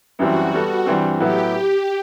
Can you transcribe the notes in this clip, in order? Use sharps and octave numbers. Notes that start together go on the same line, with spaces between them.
F#2 E3 G3 C4 E4 F#4
G3 B3 F#4 A4
G2 E3 G3 C4
A2 F#3 B3 E4 G4